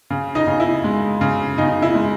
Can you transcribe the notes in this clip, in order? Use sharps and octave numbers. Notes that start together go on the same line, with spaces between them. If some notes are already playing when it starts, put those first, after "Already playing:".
C#3
D#4 D#5
C#3
E4
G#3
C#3
C#3 D#4
E4
G#3